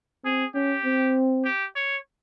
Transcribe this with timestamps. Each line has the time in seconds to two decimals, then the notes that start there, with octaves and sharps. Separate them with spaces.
0.24 C4 G#4
0.55 C#4 G4
0.85 C4
1.45 G4
1.76 C#5